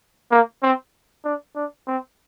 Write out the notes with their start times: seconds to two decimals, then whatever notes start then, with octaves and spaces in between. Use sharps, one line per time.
0.31 A#3
0.63 C4
1.24 D4
1.55 D4
1.87 C4